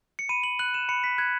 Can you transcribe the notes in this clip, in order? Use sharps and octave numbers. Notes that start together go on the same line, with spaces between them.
C#7
B5 D#7
F#7
F#6 F#7
E7
B5 C#7
B6
F#6 G#6